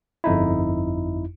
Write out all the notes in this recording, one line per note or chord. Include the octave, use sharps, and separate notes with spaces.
G1 F2 D#4 E4